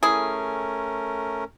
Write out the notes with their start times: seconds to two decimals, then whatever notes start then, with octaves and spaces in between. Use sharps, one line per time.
0.03 A3 C#4 E4 G#4 A#4